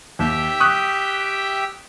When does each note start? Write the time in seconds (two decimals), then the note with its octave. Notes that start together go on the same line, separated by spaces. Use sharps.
0.19 D#2 G4 E5 G5
0.60 C#6 D#6 F#6